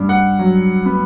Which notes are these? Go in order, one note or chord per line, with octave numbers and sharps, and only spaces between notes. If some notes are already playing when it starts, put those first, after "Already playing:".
Already playing: G2
F#5
F#3
B3